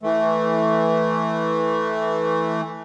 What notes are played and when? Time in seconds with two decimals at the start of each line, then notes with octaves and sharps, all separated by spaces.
0.03 E3 A3